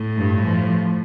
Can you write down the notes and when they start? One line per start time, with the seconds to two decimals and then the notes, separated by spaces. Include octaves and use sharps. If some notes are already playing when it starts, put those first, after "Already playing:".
Already playing: A2
0.16 G2
0.46 F3